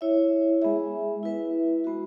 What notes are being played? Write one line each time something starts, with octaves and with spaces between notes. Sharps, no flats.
E4 C#5 E5
G#3 B3 G#4 E5
E4 B4 E5
G#3 B3 F#4